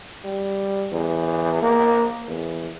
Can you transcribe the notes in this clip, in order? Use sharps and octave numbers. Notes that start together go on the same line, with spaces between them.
G3
E2
A#3
E2